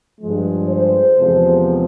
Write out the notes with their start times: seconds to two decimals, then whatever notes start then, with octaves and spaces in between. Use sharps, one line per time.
0.20 G2 F3 G#3
0.69 C5
1.19 E2 C3 F3 G#3